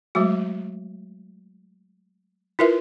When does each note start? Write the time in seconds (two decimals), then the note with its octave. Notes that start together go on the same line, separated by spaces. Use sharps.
0.15 F#3 G#3 A3 F#4
2.59 E4 F4 A#4 B4 E5